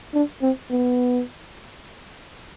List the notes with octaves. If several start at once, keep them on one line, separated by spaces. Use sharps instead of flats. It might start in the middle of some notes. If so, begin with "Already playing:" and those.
D4
C4
B3